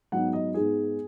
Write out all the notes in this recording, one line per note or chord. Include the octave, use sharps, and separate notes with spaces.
G#2 F#3 B3 D#4 F#5
D#5
G#2 G#3 B3 D#4 G#4